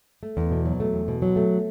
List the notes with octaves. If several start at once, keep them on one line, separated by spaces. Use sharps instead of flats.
A3
E2
B2
F#3
A3
E2
B2
F#3
A3